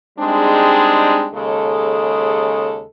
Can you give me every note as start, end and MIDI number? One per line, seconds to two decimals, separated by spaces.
0.19 1.28 55
0.19 1.28 56
0.19 1.28 60
0.19 1.28 62
0.19 1.28 63
0.19 1.28 68
1.34 2.84 39
1.34 2.84 49
1.34 2.84 56
1.34 2.84 69